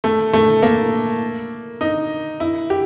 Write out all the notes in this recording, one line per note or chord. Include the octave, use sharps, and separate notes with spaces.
A3
A3
A#3
D#4
E4
G4